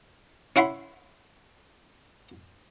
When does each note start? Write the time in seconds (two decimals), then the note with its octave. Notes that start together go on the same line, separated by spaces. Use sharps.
0.56 C#4 E4 F#5 B5 C6